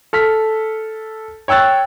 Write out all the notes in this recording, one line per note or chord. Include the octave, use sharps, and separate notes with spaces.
A4 F6 B6
C#5 G5 E6 F#6 A6